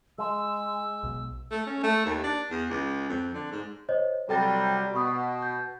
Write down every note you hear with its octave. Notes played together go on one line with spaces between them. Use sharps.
G#3 E6
B1
A3
C#4
A3
D#2
D4
E2
C#2
F2
D3
G#2
C5 C#5 D#5
C3 F#3 G3 A4 G5 A6
B2 B5 C#6 D#6
G6